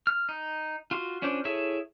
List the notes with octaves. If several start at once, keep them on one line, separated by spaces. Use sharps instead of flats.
F6
D#4
F4 F#4 C6
C#4 D4 F4 C5
E4 G#4 A4 C#5 E5